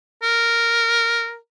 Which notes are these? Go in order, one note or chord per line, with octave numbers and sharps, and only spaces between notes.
A#4